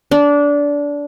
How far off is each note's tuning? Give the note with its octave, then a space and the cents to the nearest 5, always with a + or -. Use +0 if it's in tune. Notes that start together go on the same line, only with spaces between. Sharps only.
D4 -20